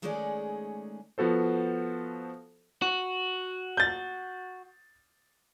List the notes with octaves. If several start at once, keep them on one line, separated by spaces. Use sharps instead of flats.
D#3 G#3 A3 C#4 G#4 D5
F3 B3 F#4 A4 C5
F#4
G6 A6